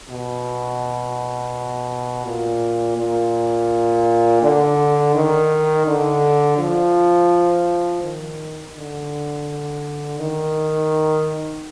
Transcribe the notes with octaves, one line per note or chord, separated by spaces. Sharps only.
B2
A#2
A#2
D3
D#3
D3
F3
D#3
D3
D#3